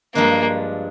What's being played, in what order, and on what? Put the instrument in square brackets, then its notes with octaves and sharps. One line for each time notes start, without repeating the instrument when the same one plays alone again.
[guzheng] G2 F3 G#3 D4 [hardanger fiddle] A#3